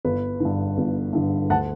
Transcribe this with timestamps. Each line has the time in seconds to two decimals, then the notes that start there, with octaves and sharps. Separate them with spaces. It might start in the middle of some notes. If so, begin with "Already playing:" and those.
0.05 G1 B4
0.40 G2 D3
0.78 G1
1.13 G2 D3
1.49 D2 F#5 A5